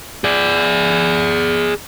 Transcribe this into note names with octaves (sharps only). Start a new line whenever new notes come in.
G#4 D5